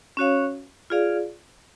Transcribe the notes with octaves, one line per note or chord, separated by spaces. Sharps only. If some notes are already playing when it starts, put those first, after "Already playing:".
C#4 F#4 C#5 F5
F4 G#4 D5 F5